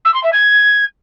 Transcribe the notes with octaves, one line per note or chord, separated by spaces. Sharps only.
E6
C6
E5
G#6